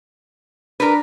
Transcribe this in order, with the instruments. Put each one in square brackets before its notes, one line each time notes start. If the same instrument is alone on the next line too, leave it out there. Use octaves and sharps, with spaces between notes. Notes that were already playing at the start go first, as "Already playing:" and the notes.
[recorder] D4 [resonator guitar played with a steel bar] A#4 B4